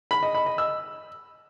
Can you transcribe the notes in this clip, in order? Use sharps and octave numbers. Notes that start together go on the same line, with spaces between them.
B5
D#5
B5
D#5
E6